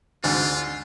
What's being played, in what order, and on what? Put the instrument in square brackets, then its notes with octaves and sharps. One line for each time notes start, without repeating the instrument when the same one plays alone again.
[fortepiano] D2 G#2 [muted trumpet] F4